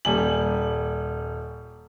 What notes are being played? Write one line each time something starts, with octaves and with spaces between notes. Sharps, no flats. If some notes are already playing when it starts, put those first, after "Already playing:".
D#1 G3 G#5 F#7